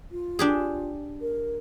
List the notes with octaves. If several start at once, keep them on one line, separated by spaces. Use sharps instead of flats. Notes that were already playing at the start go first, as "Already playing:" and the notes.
F4
D4 G4 G#4
A#4